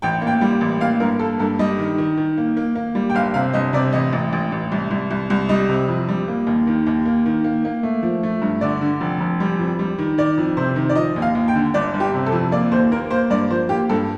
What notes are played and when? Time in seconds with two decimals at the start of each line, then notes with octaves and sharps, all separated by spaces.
0.02 A1 G5
0.22 A#3
0.27 G5
0.41 G3
0.61 A1
0.80 A#3 F5
1.00 G2 A#4
1.19 A#3 A4
1.39 G2 A4
1.59 G3 D#5
1.79 D#3
1.98 D#3
2.17 D#3
2.38 A#3
2.57 A#3
2.75 A#3
2.95 G3
3.10 G5
3.14 G1 F5
3.34 C3 F5
3.53 G1 D#5
3.73 C3 D5
3.93 A1 D#5
4.13 A1
4.33 A1
4.52 A1
4.72 C2
4.91 C2
5.11 C2
5.30 C2
5.49 G3 D#5
5.69 C3
5.88 F2
6.08 G3
6.28 A#3
6.47 D#2
6.67 D#3
6.87 D#2
7.05 A#3
7.26 D#3
7.44 A#3
7.65 A#3
7.83 A3
8.03 F3
8.23 A3
8.42 G2
8.61 D3 D5
8.81 D3
9.01 F1
9.20 F1
9.40 G3
9.59 F2
9.79 G3
9.98 D#3
10.18 D#3 D5
10.37 F2
10.57 C3 C5
10.76 D#3
10.89 D5
10.95 F3 D#5
11.16 D#2
11.22 F5
11.35 D#2
11.48 G5
11.55 D3
11.74 G1 D5
11.94 G1
12.00 G4
12.14 C3
12.26 A4
12.32 F2
12.52 A#3 D5
12.71 D#2 C5
12.91 A#3 A#4
13.10 A#3 C5
13.30 G2 D5
13.50 F3 C5
13.69 A#3 G4
13.89 G2 A4